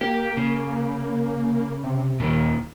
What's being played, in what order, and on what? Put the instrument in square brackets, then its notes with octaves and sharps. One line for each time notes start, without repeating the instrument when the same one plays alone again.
[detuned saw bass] A#3 [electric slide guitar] G4
[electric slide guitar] C#3
[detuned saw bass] C3
[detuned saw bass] D#2 [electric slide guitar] A#2 D#3